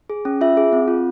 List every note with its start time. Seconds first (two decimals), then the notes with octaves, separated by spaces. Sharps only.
0.10 G#4
0.25 C#4
0.41 F4 E5
0.57 G#4
0.73 C4
0.88 F4